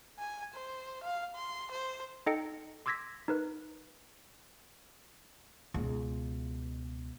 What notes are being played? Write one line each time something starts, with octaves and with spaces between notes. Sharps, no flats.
G#5
C5
F5
C6
C5
D#4 A4 D#5 G5 C#7
C6 D6 E6 G#6 A#6 B6
D#4 A#4 B4
C#2 B2